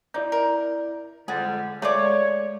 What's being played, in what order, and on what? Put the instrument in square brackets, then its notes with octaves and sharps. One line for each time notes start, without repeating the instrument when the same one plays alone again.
[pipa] D#4 [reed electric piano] E4 D5 G6
[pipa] A#4
[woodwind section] F2 D3 G3 [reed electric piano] G#3 F#5 A6 [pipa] G#4
[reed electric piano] G#3 [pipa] A3 F4 D5 [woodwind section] C#5